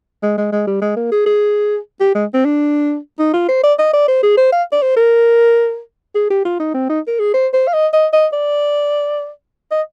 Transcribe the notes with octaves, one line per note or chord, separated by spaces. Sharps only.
G#3
G#3
G#3
G3
G#3
A#3
G#4
G#4
G4
G#3
C4
D4
D#4
F4
C5
D5
D#5
D5
C5
G#4
C5
F5
D5
C5
A#4
G#4
G4
F4
D#4
C4
D#4
A#4
G#4
C5
C5
F5
D#5
D#5
D#5
D5
D#5